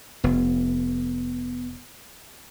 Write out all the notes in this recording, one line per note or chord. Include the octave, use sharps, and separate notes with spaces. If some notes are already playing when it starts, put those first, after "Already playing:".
F1 B3